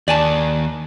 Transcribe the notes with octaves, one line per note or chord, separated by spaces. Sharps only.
D#2 D5 G#5 A5